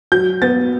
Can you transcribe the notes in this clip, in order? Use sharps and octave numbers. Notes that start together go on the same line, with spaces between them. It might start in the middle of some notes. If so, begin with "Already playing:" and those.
F#3 G6
B3 A6